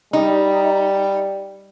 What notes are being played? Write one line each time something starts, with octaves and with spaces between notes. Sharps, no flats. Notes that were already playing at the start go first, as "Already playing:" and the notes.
G3 D#4